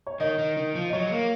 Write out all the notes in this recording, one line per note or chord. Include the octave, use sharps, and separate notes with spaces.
C#5
D#3 D#5
D#3
D#3
F3
D#5
F#3 C#5
G#3
A#3